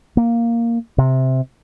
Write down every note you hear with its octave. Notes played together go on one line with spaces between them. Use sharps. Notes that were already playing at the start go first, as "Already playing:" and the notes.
A#3
C3